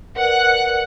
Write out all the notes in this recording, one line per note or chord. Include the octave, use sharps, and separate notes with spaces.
A#4 B4 D5 F#5 F#6